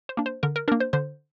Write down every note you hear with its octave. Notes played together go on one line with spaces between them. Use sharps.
C5
A#3 D4
C5
D3 A#4
A#4
A#3 D4 A#4
C5
D3 C5